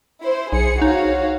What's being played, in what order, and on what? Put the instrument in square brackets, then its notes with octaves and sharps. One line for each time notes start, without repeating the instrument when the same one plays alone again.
[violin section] E4 C5
[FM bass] B1 [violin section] G#4 C#7
[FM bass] D#4 [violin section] F#4 C#5 F5